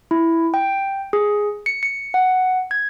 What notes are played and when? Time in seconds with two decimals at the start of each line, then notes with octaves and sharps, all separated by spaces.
0.11 E4
0.54 G5
1.13 G#4
1.66 C#7
1.83 C#7
2.14 F#5
2.71 G#6